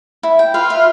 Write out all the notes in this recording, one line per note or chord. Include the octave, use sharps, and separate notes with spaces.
E4
G5
F4 B4
E5